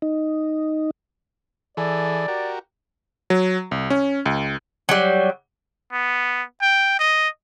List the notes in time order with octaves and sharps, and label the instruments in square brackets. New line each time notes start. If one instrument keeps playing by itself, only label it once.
[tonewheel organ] D#4
[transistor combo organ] E3 G#4 A4 [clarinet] D5
[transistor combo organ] F#4 G4 A#4
[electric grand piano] F#3
C2
C#4
C#2
[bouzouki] F#3 G3
[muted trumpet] B3
G5
D#5